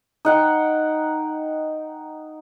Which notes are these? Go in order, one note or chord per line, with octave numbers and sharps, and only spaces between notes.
D#4 F#5 G5